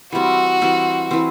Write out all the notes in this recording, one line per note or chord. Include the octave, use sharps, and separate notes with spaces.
E3 G3 C4 F#4
E3 G3 C4
E3 G3 C4